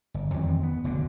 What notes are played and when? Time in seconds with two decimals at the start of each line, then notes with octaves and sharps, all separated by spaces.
0.14 G1
0.34 F2 D#3 E3 C4
0.63 B3
0.84 F#1 D2 B2 D3